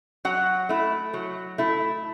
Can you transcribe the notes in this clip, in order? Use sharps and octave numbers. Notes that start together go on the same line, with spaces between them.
F#3 F#5
A3 E4
F#3
A3 E4